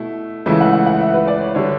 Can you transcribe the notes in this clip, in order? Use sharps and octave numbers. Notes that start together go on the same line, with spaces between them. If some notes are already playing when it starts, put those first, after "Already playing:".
Already playing: B2 A3 E4
C#2 C#3 E3 A3 E4 E5
F#5
F#5
F#5
E5
B4
D5
C#5
D3 G3 C#5